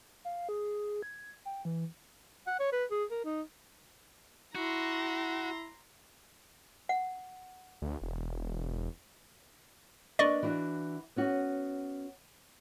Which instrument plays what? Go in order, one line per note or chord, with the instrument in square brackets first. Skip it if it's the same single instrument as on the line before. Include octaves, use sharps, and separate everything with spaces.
[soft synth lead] F5
G#4
G#6
G5
E3
[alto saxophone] F#5
C#5
B4
G#4
A#4
D#4
[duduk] E4 [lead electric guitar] F#4 [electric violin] A#5 C6
[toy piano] F#5
[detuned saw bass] D2
E1
[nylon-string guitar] A#3 D4 B4 [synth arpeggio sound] D5 D#5 C#6
[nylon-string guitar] E3 D4 F#4
B3 C#4 F#4